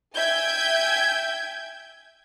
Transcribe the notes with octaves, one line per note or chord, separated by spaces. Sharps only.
E5 G5 G#5 G6 G#6